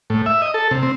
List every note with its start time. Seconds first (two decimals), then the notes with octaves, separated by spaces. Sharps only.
0.10 A2
0.26 E5
0.42 D#5
0.54 A4
0.71 C3
0.83 C4